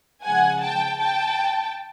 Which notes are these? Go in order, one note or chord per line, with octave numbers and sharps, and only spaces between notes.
C#3 F3 G#3 F#5 G#5
G5 A5
G5 A5